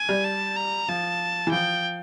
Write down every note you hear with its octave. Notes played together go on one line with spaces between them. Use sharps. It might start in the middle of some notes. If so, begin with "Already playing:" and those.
Already playing: G#5
G3
A5
A#5
F3 A5
E3
F3 G5